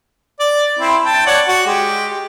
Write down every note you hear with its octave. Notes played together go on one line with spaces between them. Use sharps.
D5
C4 E4
G5 A5
C#5 D5 F#5
F#4
G#3 G4